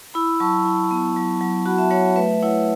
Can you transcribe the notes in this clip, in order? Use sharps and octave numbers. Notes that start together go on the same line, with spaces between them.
E4 B5 E6
F#3 A5 C#6
E4
B3
F#3
F#3
F#4 F#5 B5
E5 A5
F#3 C#5 F#5
A3 B4 E5
E4 C#5 F#5